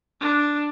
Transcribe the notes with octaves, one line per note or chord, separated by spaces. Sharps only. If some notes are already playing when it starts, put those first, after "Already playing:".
D4